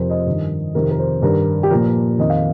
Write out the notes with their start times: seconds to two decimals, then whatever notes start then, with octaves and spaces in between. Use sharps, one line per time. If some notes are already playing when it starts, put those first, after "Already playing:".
Already playing: F2 C3 F3 A#4 C5
0.10 D#5
0.26 G2 D#3
0.75 F2 C3 D#3 A#4
0.91 A#4
0.99 C5
1.22 G2 D#3 A#4
1.63 G4
1.70 A#2 F3 A#4
2.18 F2 D#3 D#5
2.30 F5